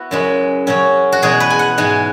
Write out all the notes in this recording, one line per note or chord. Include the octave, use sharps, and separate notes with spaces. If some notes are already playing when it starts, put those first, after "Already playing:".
Already playing: B3 E4 F#4
F#2 C#3 G#3
C#3 F#3 C#4
F#4
E2 B2 G#3 G#4
B4
G#5
F#5
G#2 E3 G#3 G#5